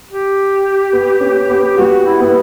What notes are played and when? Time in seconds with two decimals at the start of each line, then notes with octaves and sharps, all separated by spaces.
0.09 G4
0.93 B3
1.21 C#4
1.50 B3
1.66 G4
1.77 G3 F#4
2.06 E4
2.20 B3 E4